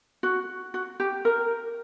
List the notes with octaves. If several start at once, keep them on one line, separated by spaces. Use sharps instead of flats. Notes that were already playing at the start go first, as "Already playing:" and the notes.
F#4
F#4
G4
A#4